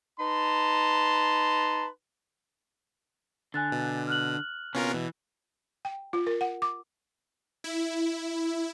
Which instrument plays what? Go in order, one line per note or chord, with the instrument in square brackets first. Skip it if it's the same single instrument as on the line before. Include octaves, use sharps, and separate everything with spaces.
[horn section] D#4 B4 A5 A#5 C6
[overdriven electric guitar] D3 [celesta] G#5 F#6 A6
[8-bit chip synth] B2
[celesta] F6 F#6 F#7
[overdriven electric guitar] C3 B3 [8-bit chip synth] C#4 F4 A#4
[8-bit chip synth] B2 [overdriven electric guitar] E3
[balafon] G5
F4
A#4
F#5
D6
[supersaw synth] E4